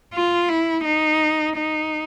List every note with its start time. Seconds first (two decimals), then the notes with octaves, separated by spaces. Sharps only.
0.14 F4
0.49 E4
0.84 D#4
1.56 D#4